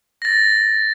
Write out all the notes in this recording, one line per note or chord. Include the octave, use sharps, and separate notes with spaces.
A6 A#6